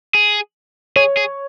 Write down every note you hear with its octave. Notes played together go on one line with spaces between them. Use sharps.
G#4
G#4 C#5
G#4